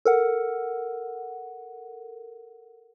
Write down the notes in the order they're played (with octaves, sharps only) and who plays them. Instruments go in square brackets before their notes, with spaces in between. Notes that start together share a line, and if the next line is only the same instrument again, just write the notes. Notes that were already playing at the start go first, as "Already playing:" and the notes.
[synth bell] A4 A#4 F#5